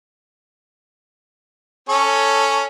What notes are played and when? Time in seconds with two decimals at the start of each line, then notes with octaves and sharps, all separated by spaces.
1.89 C#4 A4 C#5